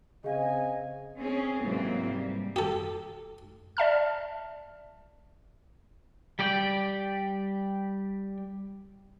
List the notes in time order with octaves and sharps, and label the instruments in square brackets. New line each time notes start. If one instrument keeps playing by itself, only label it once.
[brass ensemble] C#3 C4 G#5 [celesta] G#4 F5 [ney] D#5
[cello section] C4 C#4 G#4
G#2 C3 E3 F#3 A#3 C4
G3
[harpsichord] G4 A4
[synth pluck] D5 E5 A5 F6
[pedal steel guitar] G3 G4 D5 G5